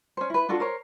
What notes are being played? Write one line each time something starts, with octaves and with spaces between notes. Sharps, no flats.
C#4 C5
E4 B4
D4 F4 F#4 A4
A#4 C5 C#5